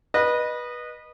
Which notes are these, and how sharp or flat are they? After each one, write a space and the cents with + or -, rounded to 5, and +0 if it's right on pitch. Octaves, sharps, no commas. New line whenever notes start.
B4 -20 D#5 -20